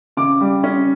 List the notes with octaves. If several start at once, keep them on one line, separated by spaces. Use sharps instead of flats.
C#3 D6
G3
C#4